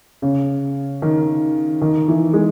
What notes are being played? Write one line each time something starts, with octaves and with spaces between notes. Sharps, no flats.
C#3
D#3
D#3
E3
G#3